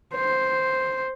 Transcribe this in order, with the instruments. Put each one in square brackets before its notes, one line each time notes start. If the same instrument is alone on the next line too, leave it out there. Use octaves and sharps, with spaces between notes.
[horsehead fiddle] C5